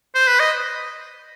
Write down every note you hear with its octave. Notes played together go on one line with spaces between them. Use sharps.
C5
B4
D#5